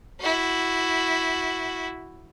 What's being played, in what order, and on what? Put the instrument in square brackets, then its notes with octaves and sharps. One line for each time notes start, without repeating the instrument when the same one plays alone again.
[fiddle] E4 F#4